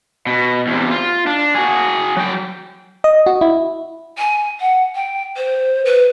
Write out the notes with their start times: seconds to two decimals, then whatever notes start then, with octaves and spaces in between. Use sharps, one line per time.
0.27 B2
0.67 E2 C3
0.91 F4
1.27 D4
1.55 F#4 G#4
2.17 F#3 G5
3.04 D#5
3.26 F#4
3.41 E4
4.18 G#5
4.60 F#5
4.95 G5
5.37 C5
5.85 B4